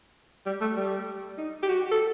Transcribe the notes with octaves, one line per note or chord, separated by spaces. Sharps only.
G3
A3
G3
D#4
G4
F#4
A4